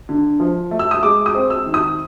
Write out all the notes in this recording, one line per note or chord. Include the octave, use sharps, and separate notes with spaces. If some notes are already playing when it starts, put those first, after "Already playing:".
D3
F3
A3
E6
D#6
G#3 D6
D#6
C4
E6
D#3
D#6